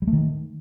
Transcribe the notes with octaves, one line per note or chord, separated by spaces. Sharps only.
G3
A3
D#3